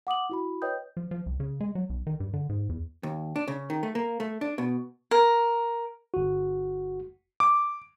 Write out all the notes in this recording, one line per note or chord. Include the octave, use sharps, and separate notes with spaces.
F#5 D6 D#6 F#7
E4 F#4 B5
B4 C#5 D#5 G5 D#6 G6
F3
F3
C2
C#3
G#3
F#3
B1
D#3
G2
D3
G#2
E2
D#2
D4
C#3
D#3
A3
A#3
A3
D4
B2
A#4
G1 F#4
D6